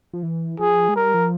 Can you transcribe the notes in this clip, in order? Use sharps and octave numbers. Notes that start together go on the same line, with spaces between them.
F3
E3
F3 G#4
G#3
G3 A#4
F3